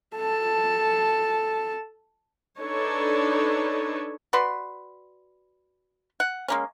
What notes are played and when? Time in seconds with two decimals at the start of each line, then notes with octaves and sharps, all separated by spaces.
0.16 A4 A5
2.58 D4 D#4 A4 B4 C#5
4.33 F#4 B4 D5 C6
6.20 F#5
6.48 G#3 A#3 C#4